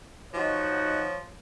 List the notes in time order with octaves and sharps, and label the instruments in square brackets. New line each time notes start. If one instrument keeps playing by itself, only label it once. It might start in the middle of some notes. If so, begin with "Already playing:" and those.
[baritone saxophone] F3 [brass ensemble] D#4 F#4 [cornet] C#5